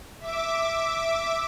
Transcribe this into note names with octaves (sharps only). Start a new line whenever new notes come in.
E5 D6